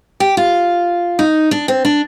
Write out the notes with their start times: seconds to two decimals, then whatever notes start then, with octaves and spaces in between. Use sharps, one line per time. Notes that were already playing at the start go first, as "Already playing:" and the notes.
0.20 G4
0.37 F4
1.19 D#4
1.51 D4
1.68 C4
1.85 D4